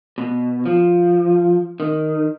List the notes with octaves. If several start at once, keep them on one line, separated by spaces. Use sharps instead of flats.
B2
F3
D#3